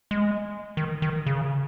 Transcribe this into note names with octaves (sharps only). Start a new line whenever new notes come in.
G#3
D#3
D#3
C#3